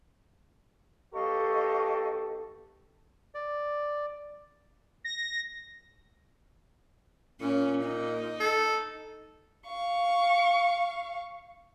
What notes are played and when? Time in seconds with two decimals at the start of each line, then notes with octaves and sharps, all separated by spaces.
1.13 B1 G4 A4 D#5 F5 C#6
3.35 D5
5.04 A#6
7.41 A#2 C#4
7.84 D#4
8.40 A4
9.67 F5 C#6